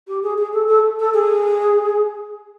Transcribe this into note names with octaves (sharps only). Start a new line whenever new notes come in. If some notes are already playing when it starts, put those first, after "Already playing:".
G4
G#4
G#4
A4
A4
A4
G#4